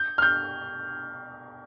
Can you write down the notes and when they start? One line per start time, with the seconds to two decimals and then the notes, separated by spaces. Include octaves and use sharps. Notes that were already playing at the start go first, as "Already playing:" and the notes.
Already playing: G6
0.18 F6
0.22 G6